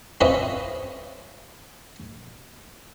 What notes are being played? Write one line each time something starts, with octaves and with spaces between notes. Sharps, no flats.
C4 C#4 F4 B4 D#5 E5